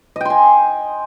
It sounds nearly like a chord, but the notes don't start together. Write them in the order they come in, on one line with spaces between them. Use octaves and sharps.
D#5 G5 C6 G#5